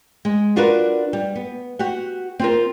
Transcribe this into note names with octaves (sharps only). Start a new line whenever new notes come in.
G#3
D4 F4 F#4 A#4 B4
G3
B3
F#4 G4 F#5
C4 F4 A#4